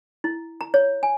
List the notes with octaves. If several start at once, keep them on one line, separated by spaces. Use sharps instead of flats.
E4
A#5
C#5
G#5